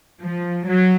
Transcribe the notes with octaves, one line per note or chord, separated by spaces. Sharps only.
F3
F#3